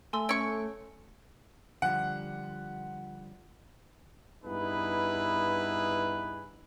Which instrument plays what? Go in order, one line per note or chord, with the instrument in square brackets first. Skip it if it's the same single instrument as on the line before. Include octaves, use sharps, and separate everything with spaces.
[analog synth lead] A3 [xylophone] G#5 C6 E6
[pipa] C#4 C#6 [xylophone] E6 G#6 D7
[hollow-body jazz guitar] D3 F3 G3 [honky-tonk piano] F#5
[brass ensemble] G2 B3 D#4 E4 G#4 B4